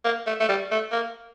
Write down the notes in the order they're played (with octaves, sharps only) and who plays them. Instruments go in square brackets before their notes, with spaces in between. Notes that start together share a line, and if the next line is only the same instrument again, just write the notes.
[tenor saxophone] A#3
A3
A3
G3
A3
A#3